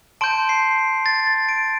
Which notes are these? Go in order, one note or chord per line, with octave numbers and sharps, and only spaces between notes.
A5 C6 G6 D7
C7
A6
A6
D7